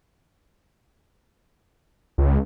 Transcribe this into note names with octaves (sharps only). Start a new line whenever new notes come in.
C#2